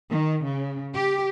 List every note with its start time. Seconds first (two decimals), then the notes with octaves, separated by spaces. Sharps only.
0.11 D#3
0.46 C#3
0.94 G4